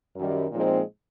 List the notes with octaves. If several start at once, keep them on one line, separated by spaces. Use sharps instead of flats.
F#2 D#3 G3
A#2 F3 G#3 C4 D#4